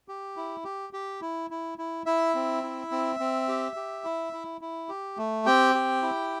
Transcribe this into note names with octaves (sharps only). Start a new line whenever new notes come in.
G4
E4
G4
G4
E4
E4
E4
E4 E5
C4
E4
C4
C4
G4
G4
E4
E4
E4
G4
A3
C4 G4 G5
G4
E4